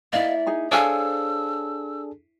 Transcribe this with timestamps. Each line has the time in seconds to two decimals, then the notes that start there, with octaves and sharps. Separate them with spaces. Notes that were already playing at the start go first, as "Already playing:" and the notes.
0.13 A#3 E4 D5 D#5 F5
0.47 D#4 G#4 A#5
0.72 D4 G#4 A4 C5 C#5 F5 G#5 E6